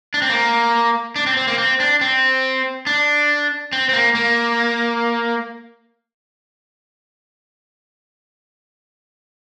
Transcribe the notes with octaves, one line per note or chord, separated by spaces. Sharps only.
D4
C4
A#3
D4
C4
C4
A#3
C4
D4
C4
D4
C4
C4
A#3
A#3